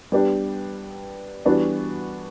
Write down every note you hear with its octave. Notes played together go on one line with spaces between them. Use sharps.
G3 B3 D4 G4
E3 G3 B3 D4 F#4